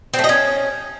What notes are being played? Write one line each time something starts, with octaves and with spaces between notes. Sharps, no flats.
C4
A3
D#5
C#4